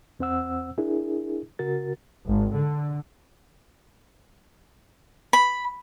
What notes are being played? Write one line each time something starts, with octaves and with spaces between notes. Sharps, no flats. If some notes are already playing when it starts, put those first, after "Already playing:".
E2 C4 C5 F#5 E6
D4 E4 G#4 A#4
C#3 F#4 A#4 A6
G#1
D3
B5